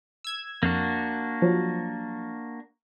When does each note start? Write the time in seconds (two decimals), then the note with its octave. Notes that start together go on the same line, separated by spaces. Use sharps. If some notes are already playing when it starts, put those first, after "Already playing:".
0.24 E6 G#6
0.63 F2 A#3 D4 F#4
1.42 F3 F#3